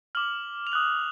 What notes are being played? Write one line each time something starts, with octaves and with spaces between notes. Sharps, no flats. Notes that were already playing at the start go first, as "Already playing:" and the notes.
D6 F6 F#7
F7
D#6 F#6 F#7